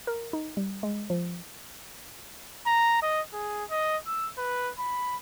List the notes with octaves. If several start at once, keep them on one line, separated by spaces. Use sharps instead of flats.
A#4
D#4
G3
G#3
F3
A#5
D#5
G#4
D#5
E6
B4
B5